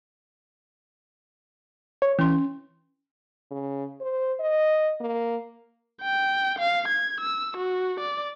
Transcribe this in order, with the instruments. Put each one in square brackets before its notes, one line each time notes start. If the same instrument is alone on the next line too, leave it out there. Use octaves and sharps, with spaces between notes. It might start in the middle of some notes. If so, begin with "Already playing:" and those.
[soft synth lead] C#5
[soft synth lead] E3 [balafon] C#4 C6
[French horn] C#3
C5
D#5
A#3
[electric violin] G5
F5
G#6
E6
F#4
D5